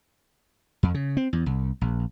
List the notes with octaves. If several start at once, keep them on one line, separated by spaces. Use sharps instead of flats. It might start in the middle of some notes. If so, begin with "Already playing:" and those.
F2
C#3
C4
E2
C2
A#1